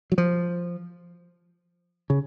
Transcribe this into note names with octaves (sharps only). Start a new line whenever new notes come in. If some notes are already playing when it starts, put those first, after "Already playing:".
F#3
F3
C#3